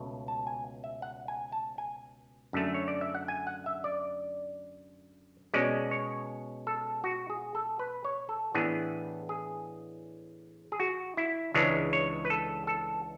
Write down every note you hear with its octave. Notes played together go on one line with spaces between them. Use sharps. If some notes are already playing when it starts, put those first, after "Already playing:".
Already playing: C#2 B2 A3
A5
G#5
E5
F#5
G#5
A5
G#5
F#2 D3 A3
C#5
D5
E5
F#5
G#5
F#5
E5
D5
B2 G#3 C#4 D5
C#5
A4
F#4
G#4
A4
B4
C#5
A4
A2 E3 B3 D4 G#4
G#4
G#4
F#4
E4
C#2 C#3 E3 G#3 D4 C#5
C#5
B4
A4
A4